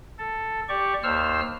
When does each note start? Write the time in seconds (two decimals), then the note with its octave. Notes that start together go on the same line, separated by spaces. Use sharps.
0.18 A4
0.69 G4 D5 C#6
1.03 D#2 C5 E6 F6